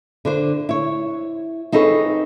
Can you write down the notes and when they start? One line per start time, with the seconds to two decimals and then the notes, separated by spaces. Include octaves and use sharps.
0.25 D3 D4 C5
0.69 E4 C#5
1.72 C4 D#4 G#4 A4 B4 C#5